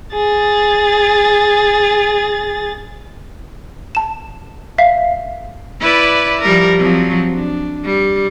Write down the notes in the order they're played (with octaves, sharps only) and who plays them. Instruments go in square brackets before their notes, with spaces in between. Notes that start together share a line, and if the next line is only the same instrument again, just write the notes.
[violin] G#4 A6
[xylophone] A5 E7
E5 F5 B6 C7
[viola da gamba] E4 B4 D5
F3 G3 A#4
F3 F#3 C4
D4
G3